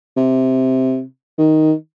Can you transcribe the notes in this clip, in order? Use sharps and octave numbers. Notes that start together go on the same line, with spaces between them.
C3
D#3